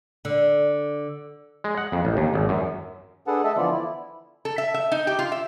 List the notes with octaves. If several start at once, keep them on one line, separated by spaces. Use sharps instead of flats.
D3
G#3
F#5
F2
A1
D#2
G#1
F#2
D4 G#4 A4 B4 F#5 A5
A3 A4 D#5 E5 A5
D3 E3 F3 B3 F4 D5
E4
A4
E5
E5
D#4
G4
F4
E5